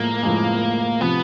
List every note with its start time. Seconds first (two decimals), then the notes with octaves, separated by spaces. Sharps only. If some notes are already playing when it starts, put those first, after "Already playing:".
Already playing: A2 F3 G#3 A#3
0.23 A2 F3 G#3
1.01 C3 F3 B3